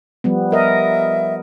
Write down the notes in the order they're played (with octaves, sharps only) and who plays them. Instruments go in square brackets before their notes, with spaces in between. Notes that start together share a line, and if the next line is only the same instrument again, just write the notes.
[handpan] F3 G3 B3
[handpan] A#4 D#5 [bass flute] E5